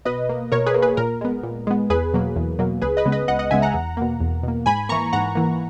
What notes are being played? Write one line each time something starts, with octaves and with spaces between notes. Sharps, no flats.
B2 B4 D#5
A#3
B2 A#4 C#5
G#4 B4
A#3
G#4 B4
A#2 A#4
G#3 B3
A#2
G#3 B3
E2 G#4 B4
B2 F#3 A#3
E2
B2 F#3 A#3
C#2 G#4 B4
B4 D#5
C#3 G#3 B3
B4 D#5
C#2 D#5 F#5
D#5 F#5
C#3 G#3 B3 E5 G#5
F#5 A#5
E2
B2 A#3
E2
B2 A#3
G#2 G#5 B5
E3 A#3 A#5 C#6
G#2 F#5 A#5
E3 A#3